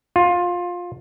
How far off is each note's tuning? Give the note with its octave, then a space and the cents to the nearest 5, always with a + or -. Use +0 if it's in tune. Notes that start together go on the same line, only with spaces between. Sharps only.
F4 +15